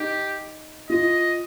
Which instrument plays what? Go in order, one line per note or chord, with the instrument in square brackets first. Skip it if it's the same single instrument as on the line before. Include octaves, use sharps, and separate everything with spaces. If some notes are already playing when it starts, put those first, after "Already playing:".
Already playing: [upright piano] D#4 [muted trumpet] G4
[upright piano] F4 [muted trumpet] D#5